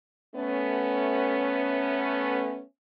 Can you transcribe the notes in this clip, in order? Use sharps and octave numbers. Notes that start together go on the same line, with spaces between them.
A3 B3 C#4